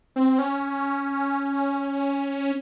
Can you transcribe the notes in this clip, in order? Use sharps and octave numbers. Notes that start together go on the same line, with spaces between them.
C4
C#4